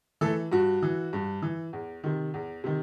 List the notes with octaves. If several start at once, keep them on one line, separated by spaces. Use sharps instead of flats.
E3 A3 A4
G2 F#4
E3
G2
E3
E2
C3 D#3
E2
C3 D#3